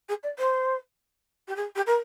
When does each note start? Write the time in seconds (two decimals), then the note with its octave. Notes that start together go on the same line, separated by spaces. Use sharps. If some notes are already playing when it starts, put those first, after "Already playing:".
0.09 G#4
0.23 D5
0.38 C5
1.48 G4
1.56 G#4
1.76 G4
1.86 A#4